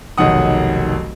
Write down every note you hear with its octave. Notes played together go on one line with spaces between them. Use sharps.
F1 B1 D#3 F#5 D#6